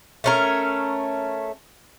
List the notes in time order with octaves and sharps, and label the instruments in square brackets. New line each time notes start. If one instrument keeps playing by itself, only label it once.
[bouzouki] A3 C#4 A#4